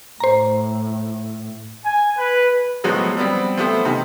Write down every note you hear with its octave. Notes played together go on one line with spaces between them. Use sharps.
A2 C5 A#5
G#5
B4
A2 F3 F#3 G#3 B3
G3 B3 C4
F3 A3 B3 G4 C5
C3 D#3